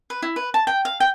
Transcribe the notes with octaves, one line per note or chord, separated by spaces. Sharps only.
B4
E4
B4
A5
G5
F5
G5